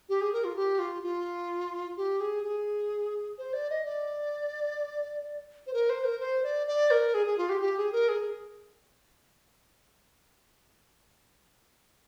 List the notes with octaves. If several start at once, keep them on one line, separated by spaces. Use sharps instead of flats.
G4
G#4
A#4
F4
G4
F4
F4
G4
G#4
G#4
C5
D5
D#5
D5
C5
A#4
C5
A#4
C5
D5
D5
A#4
G#4
G#4
F4
G4
G4
G#4
A#4
G#4